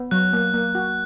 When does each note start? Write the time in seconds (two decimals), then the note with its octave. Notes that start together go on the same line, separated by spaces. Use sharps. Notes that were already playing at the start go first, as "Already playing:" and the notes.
Already playing: B3
0.11 F#3 F#6
0.33 A#3
0.54 A#3
0.75 F#4